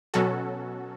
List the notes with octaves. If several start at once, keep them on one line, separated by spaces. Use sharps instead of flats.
B2 F#3 C#4 F#4 A4